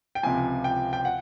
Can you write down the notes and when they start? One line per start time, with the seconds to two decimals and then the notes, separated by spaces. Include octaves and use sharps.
0.15 G5
0.23 C#2 C3 F3 G#5
0.64 G5
0.93 G5
1.05 F#5